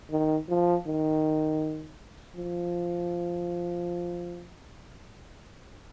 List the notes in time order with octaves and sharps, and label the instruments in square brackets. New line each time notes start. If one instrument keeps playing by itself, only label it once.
[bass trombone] D#3
F3
D#3
F3